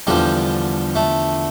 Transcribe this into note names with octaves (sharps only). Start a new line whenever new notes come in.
E2 D3 F3 G3
A3